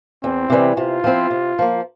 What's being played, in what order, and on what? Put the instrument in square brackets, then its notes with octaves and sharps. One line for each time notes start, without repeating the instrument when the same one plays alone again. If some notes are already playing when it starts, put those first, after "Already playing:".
[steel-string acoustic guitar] E2 [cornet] C4
[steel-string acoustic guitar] C3 E3 G3
[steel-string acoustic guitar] C3 [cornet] F4
[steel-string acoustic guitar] F3 C4 E4
C3
F3 A#3